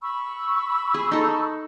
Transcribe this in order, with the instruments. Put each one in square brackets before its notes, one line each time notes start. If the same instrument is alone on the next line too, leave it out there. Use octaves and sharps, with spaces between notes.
[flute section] B5 C#6 E6
[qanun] G#4
D#4 A4